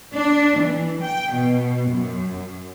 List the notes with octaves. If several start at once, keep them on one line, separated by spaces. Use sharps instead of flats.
D4
E3
G5
B2
F#2